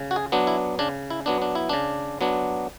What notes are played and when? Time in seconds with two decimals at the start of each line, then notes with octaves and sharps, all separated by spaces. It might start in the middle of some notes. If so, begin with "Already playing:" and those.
Already playing: C#3
0.11 F#4
0.16 G#4
0.32 F#3 B3 D4
0.47 E4
0.79 C#3 D4
1.10 E4
1.26 F#3 B3 D4
1.42 D4
1.55 E4
1.69 C#3 D4
2.21 F#3 B3 D4